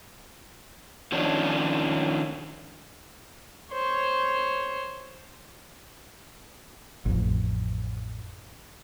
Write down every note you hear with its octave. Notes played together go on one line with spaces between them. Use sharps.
D#3 F3 C#4 D4
C5 C#5
A1 F2